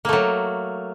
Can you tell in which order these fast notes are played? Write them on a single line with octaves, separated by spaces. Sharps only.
A#3 A3 F#3